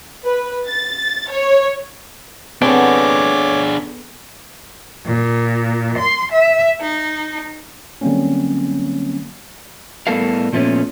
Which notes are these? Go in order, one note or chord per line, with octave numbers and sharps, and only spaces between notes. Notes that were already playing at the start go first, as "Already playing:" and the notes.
B4
A6
C#5
B3 C4 D4 G#4 A4 C#5 D6
A#2
C6
E5
D#4
D3 F#3 G3 A#3 C4 C#4
A2 G3 B3 A4 A#4 F5
A#2 F3 A3 B3 C#4